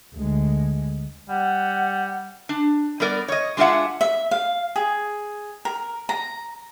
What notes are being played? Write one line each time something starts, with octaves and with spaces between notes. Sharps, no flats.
D2 G#3
G3 F#5
D4
G3 B3 A#4 D5
C#5 D#5
G#3 D4 F4 G4 E5 F#5
E5
F5
G#4
A#4
A#5